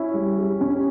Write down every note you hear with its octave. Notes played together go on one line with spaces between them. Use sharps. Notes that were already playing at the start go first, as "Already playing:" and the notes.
Already playing: C#4 E4
G3
G4
C#4
G4